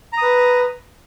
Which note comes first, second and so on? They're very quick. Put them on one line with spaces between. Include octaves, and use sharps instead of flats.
A#5 D#6 B4